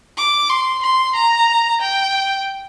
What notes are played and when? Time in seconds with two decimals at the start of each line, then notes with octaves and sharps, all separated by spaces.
0.18 D6
0.49 C6
0.83 C6
1.15 A#5
1.81 G5